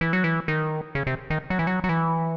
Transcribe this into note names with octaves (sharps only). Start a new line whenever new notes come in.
E3
F#3
E3
D#3
C#3
C3
D#3
F#3
E3
F#3
F#3
E3